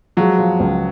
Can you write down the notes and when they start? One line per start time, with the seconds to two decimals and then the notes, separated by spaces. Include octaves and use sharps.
0.17 F3 F#3 G#3
0.39 F3
0.60 C#2